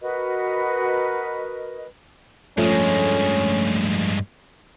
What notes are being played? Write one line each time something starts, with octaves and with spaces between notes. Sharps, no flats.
F#4 A#4 B4 D#5
G2 F3 G#3 A3 C#4